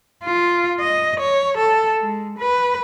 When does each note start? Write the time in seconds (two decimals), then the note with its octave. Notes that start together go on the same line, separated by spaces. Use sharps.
0.24 F4
0.80 D#5
1.20 C#5
1.57 A4
2.00 G#3
2.39 B4